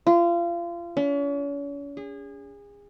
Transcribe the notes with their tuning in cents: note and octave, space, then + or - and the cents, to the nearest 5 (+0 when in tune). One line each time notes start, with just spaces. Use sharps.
F4 -30
C#4 +40
G#4 -30